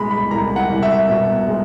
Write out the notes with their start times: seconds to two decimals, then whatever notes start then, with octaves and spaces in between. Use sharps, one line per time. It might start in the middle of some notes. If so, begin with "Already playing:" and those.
Already playing: C2 B2 G#3 B5
0.11 B5
0.30 C2 A#5
0.56 F#5
0.70 C2
0.83 E5
1.09 B2
1.48 G#3